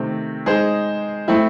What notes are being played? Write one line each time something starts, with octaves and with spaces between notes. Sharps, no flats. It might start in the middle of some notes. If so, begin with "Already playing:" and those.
Already playing: C3 D#3 A3 C4
G#3 D#4 G#4 C5
A3 C4 E4